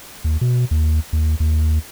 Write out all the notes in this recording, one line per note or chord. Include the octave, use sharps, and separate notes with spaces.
D#2
B2
D#2
D#2
D#2